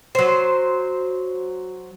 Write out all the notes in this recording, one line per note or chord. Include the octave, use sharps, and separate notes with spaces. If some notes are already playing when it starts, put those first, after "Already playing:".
F#3 C5